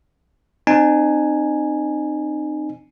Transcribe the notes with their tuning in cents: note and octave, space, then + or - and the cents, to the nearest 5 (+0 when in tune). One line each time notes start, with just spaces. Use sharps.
C4 +5 D#4 -35 G#5 +0